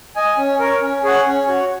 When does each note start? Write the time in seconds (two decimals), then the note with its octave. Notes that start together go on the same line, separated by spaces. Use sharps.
0.16 D#5 G#5
0.37 C#4
0.59 A#4 C#5
0.81 C#4
1.03 G#4 C#5 F#5
1.26 C#4
1.47 F#4 C#5